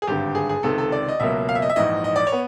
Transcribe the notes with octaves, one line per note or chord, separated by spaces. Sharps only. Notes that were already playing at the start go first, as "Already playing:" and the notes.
G#4
G#1 G2 D3 G4
G#4
G#4
C#2 C3 D#3 A4
A4
D5
D#5
C#2 B2 F#3 A#3 E5
F5
E5
D#5
E5
A#1 G#2 E3 D#5
D#5
D5
C#5
B3